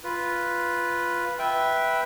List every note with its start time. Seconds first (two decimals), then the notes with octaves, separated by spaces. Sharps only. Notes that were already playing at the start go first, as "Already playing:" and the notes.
0.04 F4 B4
1.39 B4 E5 G5